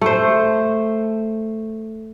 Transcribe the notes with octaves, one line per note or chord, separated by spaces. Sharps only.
A3 C5